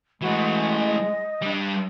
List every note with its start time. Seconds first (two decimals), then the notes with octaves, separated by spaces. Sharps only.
0.22 E3 G#3 A3 F#4
0.81 D#5
1.42 G3 D4